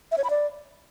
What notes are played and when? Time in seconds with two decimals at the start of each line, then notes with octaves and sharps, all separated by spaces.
0.12 E5
0.18 C#5
0.24 B5
0.30 D5